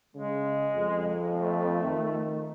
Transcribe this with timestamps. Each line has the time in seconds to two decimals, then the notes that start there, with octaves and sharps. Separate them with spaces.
0.15 C#3 G#3
0.76 F2
1.36 A3
1.83 D#3